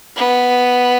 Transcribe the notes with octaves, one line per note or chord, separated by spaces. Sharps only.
B3